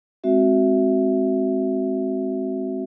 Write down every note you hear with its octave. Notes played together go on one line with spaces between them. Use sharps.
G#3 C4 F#4 E5